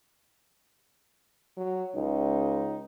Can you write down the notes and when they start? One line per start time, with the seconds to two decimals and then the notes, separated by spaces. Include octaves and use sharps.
1.57 F#3
1.95 C#2 D#4